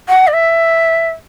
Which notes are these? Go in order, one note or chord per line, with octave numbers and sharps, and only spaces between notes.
F#5
D5
E5